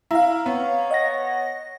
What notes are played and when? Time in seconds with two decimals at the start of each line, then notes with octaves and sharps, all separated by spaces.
0.11 E4 F5 A#5
0.46 B3 C#5
0.91 D#5 F#5 A#6